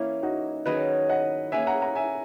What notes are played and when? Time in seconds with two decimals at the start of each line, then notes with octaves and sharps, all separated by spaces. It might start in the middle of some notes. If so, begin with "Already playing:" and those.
Already playing: E3 A#3 C#4 E4
0.23 D#4 F#4
0.66 D#3 F#3 C#4 G#4 B4 D#5
1.09 D#5 F#5
1.52 A#3 C#4 G#4 B4 E5 G#5
1.67 F#5 A#5
1.81 F#5 A#5
1.95 E5 G#5